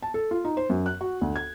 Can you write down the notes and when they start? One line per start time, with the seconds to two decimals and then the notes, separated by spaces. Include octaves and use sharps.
0.02 A5
0.14 A4
0.31 F4
0.44 D#4
0.57 C5
0.70 F#2
0.86 F#6
1.01 F#4
1.21 D2
1.36 G#6